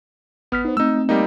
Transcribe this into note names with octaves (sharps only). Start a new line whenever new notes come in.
G#1 B3 F6 B6
D#4 C5
A3 C4 D#4 E6
G3 A#3 D#4